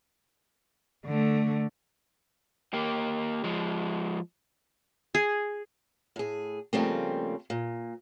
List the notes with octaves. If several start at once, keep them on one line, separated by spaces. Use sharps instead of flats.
D3 A3
A#3 G4
F3 G#3
G#4
A2 G#4
C#3 F3 G3 A3 A#3 C4
A#2